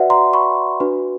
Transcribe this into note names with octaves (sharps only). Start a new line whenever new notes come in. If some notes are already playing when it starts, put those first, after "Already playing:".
Already playing: F#4 B4 D5 E5 F#5
A#5 C6
B5 C#6
D4 F#4 B4